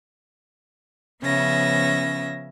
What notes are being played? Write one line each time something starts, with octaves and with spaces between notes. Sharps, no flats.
C#3 F3 B3 C#4 E5 A#6